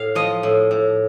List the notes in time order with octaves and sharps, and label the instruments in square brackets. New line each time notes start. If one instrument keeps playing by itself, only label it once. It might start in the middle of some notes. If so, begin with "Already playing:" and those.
Already playing: [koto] A2 F5
F3 D#5
A2
A2